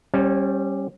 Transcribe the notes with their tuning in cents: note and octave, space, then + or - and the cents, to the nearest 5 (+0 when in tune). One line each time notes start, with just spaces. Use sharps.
G3 +0 C#4 -20 C5 +25